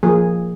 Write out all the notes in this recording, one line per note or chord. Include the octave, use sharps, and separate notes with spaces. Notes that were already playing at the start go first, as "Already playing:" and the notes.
F3 A#3 G#4